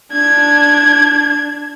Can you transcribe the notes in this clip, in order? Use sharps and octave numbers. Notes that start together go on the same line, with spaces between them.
D4 G#6